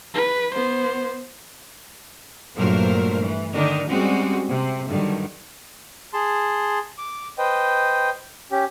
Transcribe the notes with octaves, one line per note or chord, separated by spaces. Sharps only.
B4
B3 C5
G2 A#2 F#3 A3 A#4 C5
E3
D3 D#3 D4 D#4 A#4
G3 G#3 C4 C#4 F#4
C3 C4
G2 D3 D#3 F#3
G#4 A5 C6
D6
B4 C5 D#5 G5
C#4 G4